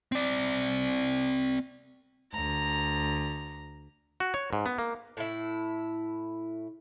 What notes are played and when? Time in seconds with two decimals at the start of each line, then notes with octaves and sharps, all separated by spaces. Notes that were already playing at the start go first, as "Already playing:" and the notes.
0.12 C4 D5
2.33 D2 A#5
4.20 F#4
4.34 C#5
4.53 G#2
4.66 B3
4.79 A#3
5.17 A2 E4